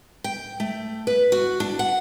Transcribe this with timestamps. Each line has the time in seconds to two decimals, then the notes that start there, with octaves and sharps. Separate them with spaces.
0.24 G5
0.60 A3
1.07 B4
1.32 F#4
1.60 D4
1.79 F#5